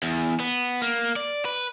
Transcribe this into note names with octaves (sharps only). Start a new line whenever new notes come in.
E2
B3
A#3
D5
B4